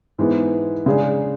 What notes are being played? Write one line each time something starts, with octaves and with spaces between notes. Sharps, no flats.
G#2 E3 G#3 B3
C#3 G#3 D4 G#4